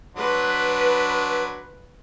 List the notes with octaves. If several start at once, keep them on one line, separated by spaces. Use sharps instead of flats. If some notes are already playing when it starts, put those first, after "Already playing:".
F#3 D4 B4 C6